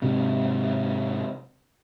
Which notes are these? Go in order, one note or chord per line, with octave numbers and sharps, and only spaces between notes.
G#2 C3 F#3